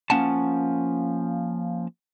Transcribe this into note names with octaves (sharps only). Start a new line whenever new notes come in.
F3 A#3 C#4 F#5 A5